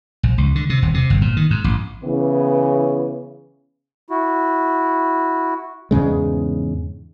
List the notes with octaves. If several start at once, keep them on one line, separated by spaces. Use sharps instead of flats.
A#1
C#2
D3
C3
D#1
C3
G1
A#2
D#3
G#2
A1
C#3 E3 B3
E4 F#4
E2 G#2 C#3 G#3